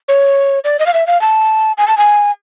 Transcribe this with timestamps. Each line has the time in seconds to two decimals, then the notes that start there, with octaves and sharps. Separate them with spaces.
0.08 C#5
0.64 D5
0.79 D#5
0.86 F5
0.94 E5
1.07 F5
1.21 A5
1.78 G#5
1.88 A5
1.97 G#5